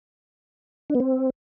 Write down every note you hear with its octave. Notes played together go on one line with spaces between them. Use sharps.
D4
B3
C4